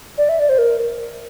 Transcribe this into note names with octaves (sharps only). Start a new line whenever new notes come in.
D5
E5
D5
C5
A#4